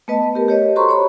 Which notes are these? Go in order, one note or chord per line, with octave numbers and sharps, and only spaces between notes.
A3 B3 B4 D#5 A5
G4 A#4
G4 C#5 D#5
F#4 A4 C5 A#5 C6 C#6
C#5 B5